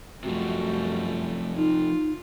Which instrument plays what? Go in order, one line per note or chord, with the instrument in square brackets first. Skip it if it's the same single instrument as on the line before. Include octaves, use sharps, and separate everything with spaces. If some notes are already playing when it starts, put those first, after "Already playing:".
[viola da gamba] F#2 G3 A3 [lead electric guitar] C3 F3 [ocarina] F#4
[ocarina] D#4 [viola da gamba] F4